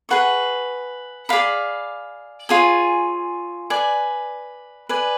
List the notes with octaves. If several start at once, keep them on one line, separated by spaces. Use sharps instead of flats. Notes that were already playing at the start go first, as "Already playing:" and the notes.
G#4 B4 F#5 C#6
G#4 D5 F5 B5
F4 G#4 C#5 G#5
B4 D5 G#5
B4 D5 G#5